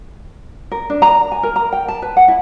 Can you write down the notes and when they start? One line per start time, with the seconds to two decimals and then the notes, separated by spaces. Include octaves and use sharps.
0.72 A#4
0.90 D4
1.02 A#5
1.32 G#5
1.43 A#4
1.56 A#5
1.73 G5
1.88 A5
2.02 B4
2.17 F#5
2.28 E4